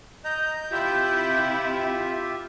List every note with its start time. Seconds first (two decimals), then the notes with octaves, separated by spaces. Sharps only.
0.25 D#5 A#5 G6
0.72 C3 E4 F4 G4 E5